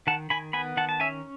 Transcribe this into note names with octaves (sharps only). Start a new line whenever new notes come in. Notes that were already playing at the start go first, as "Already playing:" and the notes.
D#3 F#5 A5
D#3 G#5 B5
B3 G#5 B5
D#3 F#5 A5
A5
C#4 E5 G#5